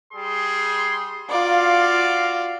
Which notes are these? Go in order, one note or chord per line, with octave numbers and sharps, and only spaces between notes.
G3 G#4 C6
F4 F#4 D5 F5